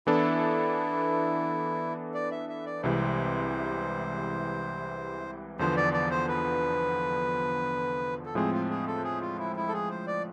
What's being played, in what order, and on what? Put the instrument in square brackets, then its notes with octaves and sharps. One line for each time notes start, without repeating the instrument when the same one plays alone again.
[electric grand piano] E3 B3 D4 A4 [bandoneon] E4
[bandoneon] D5
E5
E5
D5
[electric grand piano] C2 C3 E3 G#3 [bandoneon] C5
[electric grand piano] E2 D3 F3 B3 [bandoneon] C5
[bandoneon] D5
D5
C5
B4
A4
[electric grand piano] A2 F3 G#3 C4 [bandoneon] G#4
[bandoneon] F4
G#4
A4
G#4
F4
E4
E4
A4
G#4
C5
D5